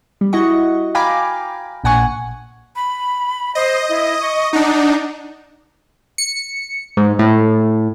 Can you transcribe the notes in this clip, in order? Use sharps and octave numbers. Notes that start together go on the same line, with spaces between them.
G3
E4 F#4 D#5 F#5 C#6
F5 G5 G#5 A#5 B5 D6
A#1 A#2 F#5 G#5 C#6
B5
C5 D#5
E4
C#6
D4 D#4 F#5
C#7
G#2
A2